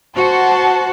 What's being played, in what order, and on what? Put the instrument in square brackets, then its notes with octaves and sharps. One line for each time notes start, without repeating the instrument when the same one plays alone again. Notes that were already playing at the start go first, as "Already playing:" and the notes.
[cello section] F#4 [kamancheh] C5 A5